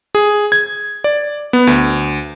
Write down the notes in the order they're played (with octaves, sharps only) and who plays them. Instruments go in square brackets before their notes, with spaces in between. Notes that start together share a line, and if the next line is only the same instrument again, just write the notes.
[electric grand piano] G#4
G#6
D5
B3
D2